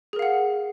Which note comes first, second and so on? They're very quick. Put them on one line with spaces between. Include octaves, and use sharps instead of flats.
G#4 A#4 F5 F#5